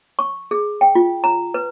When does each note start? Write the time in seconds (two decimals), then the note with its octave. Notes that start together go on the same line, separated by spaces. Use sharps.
0.19 C#6
0.51 G#4
0.81 G5
0.95 F4
1.24 A#5
1.54 B4